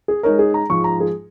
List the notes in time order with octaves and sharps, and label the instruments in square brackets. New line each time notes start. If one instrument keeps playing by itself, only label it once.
[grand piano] G#4
[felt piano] G#3 D#4 C#5 [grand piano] A#4
[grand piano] G#4
A#5
[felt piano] G#2 F3 G#3 [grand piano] C#6
[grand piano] A#5
G#4